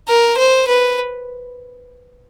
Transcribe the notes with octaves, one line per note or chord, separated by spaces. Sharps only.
A#4
C5
B4